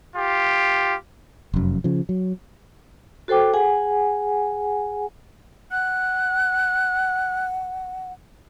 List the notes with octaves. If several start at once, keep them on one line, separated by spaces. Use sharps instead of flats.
F4 G4
F1 F#2
C#3 F3
F#3
F#4 A4 C5 G5 D6
G#4 F#5 G#5
F#5 F#6